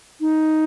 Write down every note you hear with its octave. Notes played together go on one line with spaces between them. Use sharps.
D#4